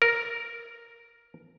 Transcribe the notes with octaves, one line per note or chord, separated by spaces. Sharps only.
A#4